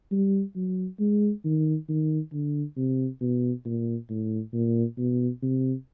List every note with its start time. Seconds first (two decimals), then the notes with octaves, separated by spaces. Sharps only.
0.11 G3
0.56 F#3
1.00 G#3
1.45 D#3
1.89 D#3
2.33 D3
2.77 C3
3.21 B2
3.65 A#2
4.10 A2
4.53 A#2
4.98 B2
5.43 C3